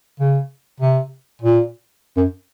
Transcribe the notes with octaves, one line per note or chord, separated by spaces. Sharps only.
C#3
C3
A#2
F#2